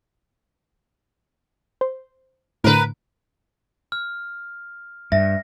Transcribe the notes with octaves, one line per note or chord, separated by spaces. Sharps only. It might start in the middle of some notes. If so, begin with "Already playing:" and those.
C5
A2 D3 A#4 B4
F6
G2 E5 A#6